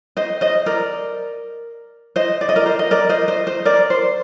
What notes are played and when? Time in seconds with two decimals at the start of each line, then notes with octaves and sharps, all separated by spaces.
0.17 C5 D#5
0.41 C5 D#5
0.66 A#4 D5
2.16 C5 D#5
2.41 D5
2.49 D#5
2.56 A#4 D5
2.66 C5
2.79 D#5
2.91 A#4 D5
3.09 C5 D#5
3.28 C5 D#5
3.47 C5 D#5
3.65 A#4 D5
3.90 C5